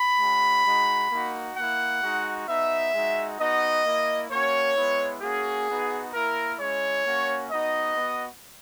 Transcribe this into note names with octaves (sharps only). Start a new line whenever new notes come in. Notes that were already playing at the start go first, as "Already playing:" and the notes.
Already playing: B5
G#3 C#4 F#4
G#3 D#4 F#4
A#3 D#4 F#4
A#3 E4 F#5
G#3 D#4 F#4
B3 D#4 F#4 E5
G#3 D#4 F#4
B3 D#4 F#4 D#5
A#3 E4
A#3 C#4 F#4 C#5
G#3 B3 E4
A#3 C#4 F#4 G#4
B3 D#4 F#4
A#3 E4 A#4
G#3 C#4 E4 C#5
A#3 C#4 F#4
B3 D#4 F#4 D#5
B3 F#4